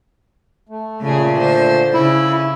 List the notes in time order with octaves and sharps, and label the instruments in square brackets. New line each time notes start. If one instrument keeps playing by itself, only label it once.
[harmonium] A3
[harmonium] A#2 A3 [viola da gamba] C#3 G#4
[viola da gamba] D3 C5
[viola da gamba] C#3 [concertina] E4 [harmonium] E5